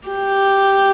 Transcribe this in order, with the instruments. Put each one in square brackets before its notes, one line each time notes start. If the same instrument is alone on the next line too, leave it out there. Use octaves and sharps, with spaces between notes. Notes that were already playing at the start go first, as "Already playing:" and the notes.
[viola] G4